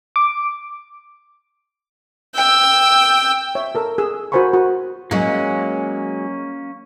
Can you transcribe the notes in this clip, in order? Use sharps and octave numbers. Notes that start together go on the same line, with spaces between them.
D6
G5 E6
C#5 E5
A4 A#4 E6
G#4 E6
F#4 A#4 C5 G#5 B5 C#6
F#4
F#3 G#3 A#3 C#4